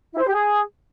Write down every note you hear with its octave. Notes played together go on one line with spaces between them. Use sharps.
E4
C5
G4
G#4